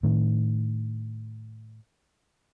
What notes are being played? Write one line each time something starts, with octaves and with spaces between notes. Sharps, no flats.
A2 D#3